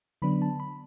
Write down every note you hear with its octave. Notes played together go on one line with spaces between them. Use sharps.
D3 F#3 B3 D4 B5
A5
B5